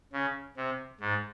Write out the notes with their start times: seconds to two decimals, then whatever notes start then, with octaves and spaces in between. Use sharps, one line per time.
0.12 C#3
0.57 C3
1.00 G#2